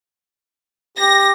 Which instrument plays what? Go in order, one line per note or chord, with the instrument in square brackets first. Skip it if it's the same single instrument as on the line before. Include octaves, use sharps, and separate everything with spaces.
[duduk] G4 [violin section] A#6